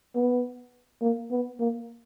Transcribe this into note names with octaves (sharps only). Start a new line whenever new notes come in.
B3
A#3
B3
A#3